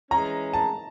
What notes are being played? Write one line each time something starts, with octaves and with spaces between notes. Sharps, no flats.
E3 G#3 C#4 A#5
A5